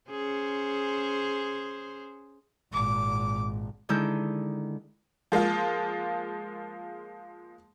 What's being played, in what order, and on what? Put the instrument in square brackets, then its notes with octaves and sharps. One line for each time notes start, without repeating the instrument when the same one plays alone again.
[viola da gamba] C#4 G#4 C5
[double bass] G#1 A#2 [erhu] D6
[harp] D3 D#3 G#3 E4 E6 G6
[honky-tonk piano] F3 G#3 A#3 F4